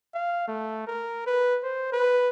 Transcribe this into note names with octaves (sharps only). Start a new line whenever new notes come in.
F5
A3
A#4
B4
C5
B4